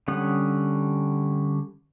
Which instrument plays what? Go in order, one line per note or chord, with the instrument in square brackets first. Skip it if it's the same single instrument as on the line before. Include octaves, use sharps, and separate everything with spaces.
[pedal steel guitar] D3 G3 C#4 F#5 D#6